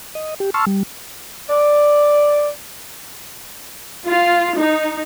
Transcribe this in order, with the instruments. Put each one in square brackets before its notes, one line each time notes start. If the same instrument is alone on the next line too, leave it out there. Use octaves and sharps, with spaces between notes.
[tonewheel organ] D#5
G4
A5 C6 C#6 E6 F6
G3
[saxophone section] D5
[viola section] F4
D#4